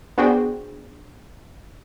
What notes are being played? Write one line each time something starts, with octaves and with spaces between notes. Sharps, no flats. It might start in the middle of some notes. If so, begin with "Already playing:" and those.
B3 D4 F#4 G#4 C5 G5